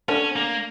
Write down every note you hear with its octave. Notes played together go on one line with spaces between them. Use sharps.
D3 C#4 D4
A#3